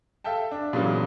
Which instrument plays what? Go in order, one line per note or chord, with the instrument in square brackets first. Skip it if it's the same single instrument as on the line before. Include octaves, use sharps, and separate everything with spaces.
[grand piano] A4 E5 F5 G5 A5
D4
A#2 C#3 E3 F#3 A#3 B3